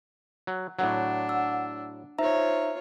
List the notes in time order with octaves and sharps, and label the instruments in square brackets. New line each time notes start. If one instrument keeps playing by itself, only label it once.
[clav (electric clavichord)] F#3
[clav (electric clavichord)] A2 F#3 [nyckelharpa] D4 [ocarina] F#5
[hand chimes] E6
[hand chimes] D#4 E5 A#5 [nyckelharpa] F4 C#5 [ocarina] C5